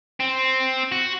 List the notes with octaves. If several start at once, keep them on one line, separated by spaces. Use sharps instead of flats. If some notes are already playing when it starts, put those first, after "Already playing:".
C4
F#4